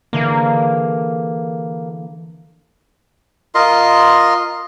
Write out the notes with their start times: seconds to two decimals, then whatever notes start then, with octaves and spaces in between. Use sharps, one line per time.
0.13 D3 E3 A#3 G#4
3.55 F4 A#4 D#5 C6